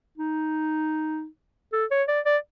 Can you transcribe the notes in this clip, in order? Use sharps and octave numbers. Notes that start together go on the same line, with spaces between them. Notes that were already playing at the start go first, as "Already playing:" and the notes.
D#4
A4
C#5
D5
D5